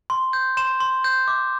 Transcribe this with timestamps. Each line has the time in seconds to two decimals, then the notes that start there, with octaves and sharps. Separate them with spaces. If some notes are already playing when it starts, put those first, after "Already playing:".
0.10 C6
0.33 G6
0.57 C6 E7
0.80 C6
1.04 G6
1.28 D6